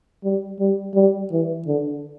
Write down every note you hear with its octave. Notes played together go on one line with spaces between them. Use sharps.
G3
G3
G3
E3
D3